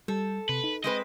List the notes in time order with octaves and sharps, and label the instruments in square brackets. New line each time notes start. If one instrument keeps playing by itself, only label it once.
[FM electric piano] G3 [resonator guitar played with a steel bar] A4
[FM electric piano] C3 [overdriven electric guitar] B4
[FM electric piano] D#4
[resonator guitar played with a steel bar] G#3 C4 B4 [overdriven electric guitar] D#5